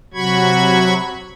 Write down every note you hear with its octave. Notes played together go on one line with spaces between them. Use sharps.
C3 F#3 F#4 B5 C#6 G#6